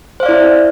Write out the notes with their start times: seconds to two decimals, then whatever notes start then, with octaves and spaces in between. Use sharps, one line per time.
0.20 C5
0.23 F5
0.26 D5
0.29 E4